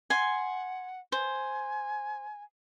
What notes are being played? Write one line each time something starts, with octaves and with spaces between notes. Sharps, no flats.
F#5 G#5 C6
C5 G#5